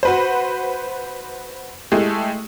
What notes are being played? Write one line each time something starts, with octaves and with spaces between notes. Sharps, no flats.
F#4 B4 C5
G#3 A3 E4 G4